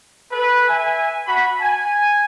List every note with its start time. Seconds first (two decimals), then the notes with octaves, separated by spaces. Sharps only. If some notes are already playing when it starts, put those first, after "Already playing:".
0.31 A4 B4
0.68 E5 G#5
1.27 F#4 B5
1.61 G#5